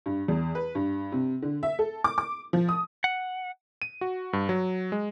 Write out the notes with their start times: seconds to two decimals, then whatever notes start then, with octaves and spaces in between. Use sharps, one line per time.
0.06 G2
0.28 E2
0.55 B4
0.75 G2
1.12 C3
1.42 D3
1.63 E5
1.79 A4
2.04 D6
2.18 D6
2.53 F3
2.69 D#6
3.04 F#5
3.82 D#7
4.01 F#4
4.33 G2
4.49 F#3
4.92 G#3